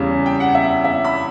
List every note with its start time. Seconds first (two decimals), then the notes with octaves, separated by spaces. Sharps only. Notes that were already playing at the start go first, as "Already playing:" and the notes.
Already playing: E2 C#3 G3
0.26 G5
0.40 F#5
0.55 E5
0.84 E5
1.04 B5